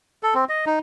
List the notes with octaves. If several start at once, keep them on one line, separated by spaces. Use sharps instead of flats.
A4
C4
D#5
D#4